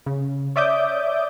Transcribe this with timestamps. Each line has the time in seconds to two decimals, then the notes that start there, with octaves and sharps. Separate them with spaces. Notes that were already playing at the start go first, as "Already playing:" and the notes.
0.06 C#3
0.56 C#5 D5 E5 D6 D#6 G6